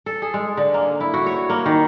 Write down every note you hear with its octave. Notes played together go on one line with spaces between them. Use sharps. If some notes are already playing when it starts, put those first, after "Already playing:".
A4
G#4
G#3
D3
A#3
E4
F#4
C#5
A#3
D#3